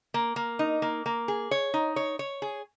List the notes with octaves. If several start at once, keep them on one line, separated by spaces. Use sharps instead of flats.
A#3
A#3
D#4
A#3
A#3
G#4
C#5
D#4
C#5
C#5
G#4